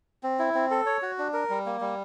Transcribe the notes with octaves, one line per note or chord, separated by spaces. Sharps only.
C4
E4
C4
A4
C#5
F#4
D4
A#4
G3
A#3
G3